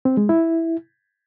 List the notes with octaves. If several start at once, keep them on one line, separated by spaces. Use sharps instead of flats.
C4
G#3
E4